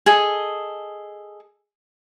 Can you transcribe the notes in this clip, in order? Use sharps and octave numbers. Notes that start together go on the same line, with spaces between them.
G#4 A4 D#5